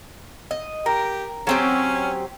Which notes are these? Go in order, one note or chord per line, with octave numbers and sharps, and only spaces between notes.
D#5
G4 A#4
F#3 C4 C#4 G4